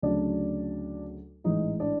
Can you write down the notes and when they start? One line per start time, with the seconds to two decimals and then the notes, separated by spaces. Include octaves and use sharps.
0.02 D2 C#3 F#3 D4 D5
1.44 A1 G#2 E3 G#3 D#4 D#5
1.80 D4 D5